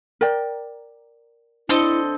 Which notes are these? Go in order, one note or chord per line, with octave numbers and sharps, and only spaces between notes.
A#4 D5 G5
C4 D4 E4 A4 D#5